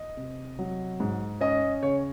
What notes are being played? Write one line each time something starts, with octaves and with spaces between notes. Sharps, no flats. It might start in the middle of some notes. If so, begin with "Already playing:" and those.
Already playing: D#5
C3
F#3
G#2
C#4 D#5
C#3 C#5